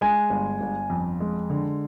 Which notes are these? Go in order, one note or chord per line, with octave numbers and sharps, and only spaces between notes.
G#3 G#5
G1
G1
F2
G#3
D3